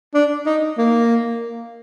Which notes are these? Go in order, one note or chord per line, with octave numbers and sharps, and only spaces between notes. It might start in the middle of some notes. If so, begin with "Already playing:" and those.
D4
D#4
A#3